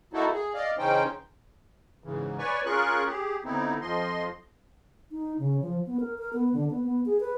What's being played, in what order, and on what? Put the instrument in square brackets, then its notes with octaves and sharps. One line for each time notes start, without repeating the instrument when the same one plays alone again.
[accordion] A#3 D#4 E4 F#4 A4
G#4
D5 D#5 F5
C#3 E3 C#4 D#4 C5 G5
G#2 C#3 E3
B4 C#5 D5 G#5 C#6
C#4 F4 G#4 A#4 C#6 F#6
G4 G#4
D3 B3 C4 D#4 E4
F2 F3 D#5 C6
[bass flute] D#4
C#3
F3
B3
A#4
A#4
B3
D3
B3
B3
G#4
B4